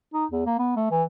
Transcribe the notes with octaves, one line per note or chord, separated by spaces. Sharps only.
D#4
E2
A#3
B3
A3
E3